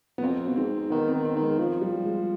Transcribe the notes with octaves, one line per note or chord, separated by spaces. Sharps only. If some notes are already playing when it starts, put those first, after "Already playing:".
B3
F2 C4
B2
G#2 C4
D#3 B3
C4
D#3
C4
D#3
G#3
F3
G3
G#3